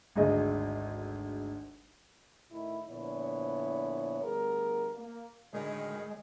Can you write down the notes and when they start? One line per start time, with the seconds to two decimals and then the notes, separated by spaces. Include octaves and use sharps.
0.16 G#1 D2 G#4 D#5
2.51 A2 D#3 E4
2.88 A#2 D3 F3 B3 E4 C#5
4.21 D2 G3 B3 G#4 A#4
4.94 A#3
5.53 A2 D3 D#3 G#3 F#4 G#4 A#4